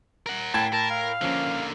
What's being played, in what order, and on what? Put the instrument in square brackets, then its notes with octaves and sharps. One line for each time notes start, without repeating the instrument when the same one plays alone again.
[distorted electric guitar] A#4 F#5
[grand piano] A2 G5 G#6 [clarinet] A5
[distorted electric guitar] A#4 [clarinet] A5
[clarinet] F5
[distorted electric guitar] D3 A#3 [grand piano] F3 C#4